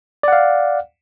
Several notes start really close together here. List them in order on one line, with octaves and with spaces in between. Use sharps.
D5 F#5 F5